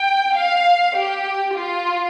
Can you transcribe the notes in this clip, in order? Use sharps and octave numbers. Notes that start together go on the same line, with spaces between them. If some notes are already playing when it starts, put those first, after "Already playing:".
Already playing: G5
F5
G4
F4